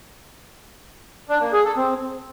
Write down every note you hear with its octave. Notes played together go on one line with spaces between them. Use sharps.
D4
A#3
G#4
A4
C4